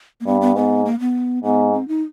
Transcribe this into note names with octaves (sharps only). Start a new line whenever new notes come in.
A#3
G2 B3
B3
G#2 B3
A#3
B3
G#2 B3
C4
D#4